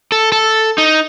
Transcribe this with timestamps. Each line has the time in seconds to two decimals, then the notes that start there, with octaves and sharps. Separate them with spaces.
0.12 A4
0.32 A4
0.78 D#4